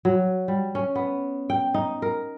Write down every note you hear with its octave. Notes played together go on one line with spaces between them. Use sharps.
F#3
G3
C#4
B3
G5
D#4
A#4